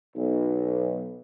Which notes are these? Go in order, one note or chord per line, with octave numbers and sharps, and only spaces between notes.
B1